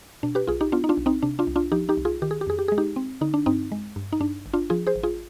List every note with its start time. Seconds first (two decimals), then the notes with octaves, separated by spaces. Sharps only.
0.23 B2 D4
0.35 G4 B4
0.47 B1 F4 G#4
0.61 D#4 G4
0.72 B3 D4 F4
0.84 D#4
0.89 D4 F4
0.97 B1
1.06 C4 D#4
1.23 C3 D4
1.39 D4 F4
1.47 C2
1.56 D4 F4
1.72 F3 D#4 G4
1.89 D#4 G4
1.97 C2
2.05 F4 G#4
2.22 D#3 G4
2.31 G#4
2.41 G4
2.47 F2 G#4
2.59 G4
2.68 G#3 G#4
2.78 D#4 G4
2.96 C4
3.21 D3 D#4
3.34 D4
3.46 G2 C4 D#4
3.72 G#3
3.96 G2
4.13 D#4
4.20 G2 D4
4.46 G#1
4.53 D4 F4
4.70 F3 F4 G#4
4.87 G#4 C5
4.96 G#1
5.03 F4 G#4